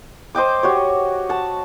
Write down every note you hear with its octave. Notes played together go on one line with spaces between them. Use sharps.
C5 D#5 G5 D6
F#4 G4 C#5
F#5 A5